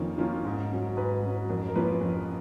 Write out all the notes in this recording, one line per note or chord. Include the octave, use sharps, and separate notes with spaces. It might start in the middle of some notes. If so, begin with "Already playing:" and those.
Already playing: F2 D#3 A#3 C#4 F4
D#3 A#3 C#4 F4
G#2
F#3 C#4
G#2 B4
F#3 C#4
F2 A#4
A#4
F3 A#3 C#4 F4 B4
F2